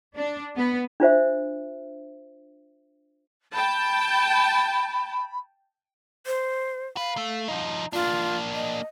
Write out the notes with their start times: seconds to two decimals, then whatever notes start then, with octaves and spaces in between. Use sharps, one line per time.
0.16 D4
0.56 B3
1.00 D4 F4 C5 E5
3.54 G5 A5 B5
6.26 C5
6.97 B4 F5
7.17 A3
7.48 F3 D#4
7.93 A#3 D4 F4
8.54 D#5